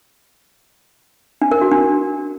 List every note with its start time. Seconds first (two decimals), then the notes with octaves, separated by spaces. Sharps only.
1.42 D4
1.52 A#4
1.61 F#4
1.71 D4